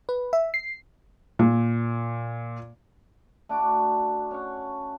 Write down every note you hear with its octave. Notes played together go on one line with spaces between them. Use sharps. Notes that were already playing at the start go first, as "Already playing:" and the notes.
B4
E5
C7
A#2
A3 D4 F#4 D6
C#4 C#5 F#5